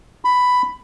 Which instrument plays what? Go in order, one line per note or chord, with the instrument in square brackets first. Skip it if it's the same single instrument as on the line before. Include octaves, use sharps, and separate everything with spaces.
[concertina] B5